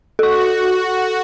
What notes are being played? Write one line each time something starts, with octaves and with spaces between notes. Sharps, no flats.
F#4 A4 C#6